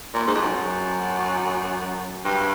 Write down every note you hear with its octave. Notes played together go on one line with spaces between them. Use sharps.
A#2
G#2
F2
F#2
F#2
G2